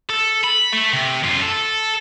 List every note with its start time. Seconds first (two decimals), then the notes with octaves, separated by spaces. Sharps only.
0.09 A4
0.44 B5
0.72 A3
0.93 C3
1.23 F#2 F4
1.42 A4